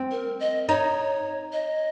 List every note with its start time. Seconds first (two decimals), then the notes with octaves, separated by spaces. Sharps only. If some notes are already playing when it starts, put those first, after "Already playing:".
Already playing: C4
0.11 A#4
0.40 D#5
0.69 D#4 C#5
1.53 D#5